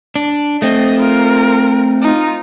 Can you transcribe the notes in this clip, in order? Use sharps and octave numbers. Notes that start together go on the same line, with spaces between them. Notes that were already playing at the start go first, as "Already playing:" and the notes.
D4
A3 C4 D#5
F4 A#4
D#4 F4